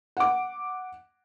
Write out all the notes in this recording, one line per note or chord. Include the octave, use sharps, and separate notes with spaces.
F#5 D6